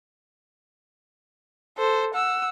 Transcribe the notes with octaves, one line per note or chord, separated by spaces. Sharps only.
A4 C5
F#5 E6